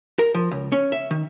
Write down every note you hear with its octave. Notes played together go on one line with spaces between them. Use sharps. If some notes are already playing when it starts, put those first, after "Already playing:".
A#4
F3
C#2
C#4
E5
D#3